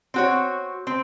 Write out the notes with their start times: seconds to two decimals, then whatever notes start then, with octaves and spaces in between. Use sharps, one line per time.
0.14 C4 F#4 C#5
0.87 C4